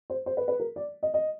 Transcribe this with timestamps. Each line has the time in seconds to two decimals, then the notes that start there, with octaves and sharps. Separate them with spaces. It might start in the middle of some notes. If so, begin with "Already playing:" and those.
0.10 C5
0.26 C5
0.37 B4
0.48 B4
0.60 A#4
0.76 D5
1.03 D#5
1.14 D#5